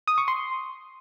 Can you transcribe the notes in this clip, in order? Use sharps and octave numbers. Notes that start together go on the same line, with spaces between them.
D#6
C#6
C6